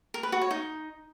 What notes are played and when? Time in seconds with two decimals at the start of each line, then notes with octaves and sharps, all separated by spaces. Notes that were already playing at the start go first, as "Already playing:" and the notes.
0.14 A#4
0.23 B4
0.32 F#4
0.41 C#5
0.51 D#4